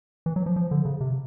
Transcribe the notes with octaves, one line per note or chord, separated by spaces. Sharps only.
E3
F#3
F3
F3
D3
C#3
C3